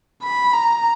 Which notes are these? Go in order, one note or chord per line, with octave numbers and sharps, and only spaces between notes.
B5
A#5